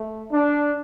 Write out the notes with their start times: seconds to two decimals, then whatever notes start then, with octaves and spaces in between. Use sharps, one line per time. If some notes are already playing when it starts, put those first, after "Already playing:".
Already playing: A3
0.31 D4